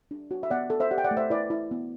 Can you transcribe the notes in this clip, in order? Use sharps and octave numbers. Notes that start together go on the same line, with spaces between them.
D4
F#4
E5
B3 D5 F#5
B3 A4
C5 E5
G4 D5 F#5
G5
D5 F#5
A3
C5 E5
E4 B4 D5
E4
B3